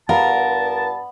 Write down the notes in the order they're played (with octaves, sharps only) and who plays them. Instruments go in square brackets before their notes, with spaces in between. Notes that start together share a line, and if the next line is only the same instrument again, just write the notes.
[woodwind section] G2 A5 [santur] B3 D5 [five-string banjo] F4 [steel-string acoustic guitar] A#4